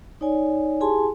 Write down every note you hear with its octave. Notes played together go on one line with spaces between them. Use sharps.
D#4 C#5 D5 G#5
E4 G4 G#4 G#5 A5 C6